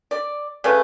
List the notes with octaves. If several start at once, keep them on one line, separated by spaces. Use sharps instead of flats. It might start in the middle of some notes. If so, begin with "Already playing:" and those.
D5
C#3 A3 B4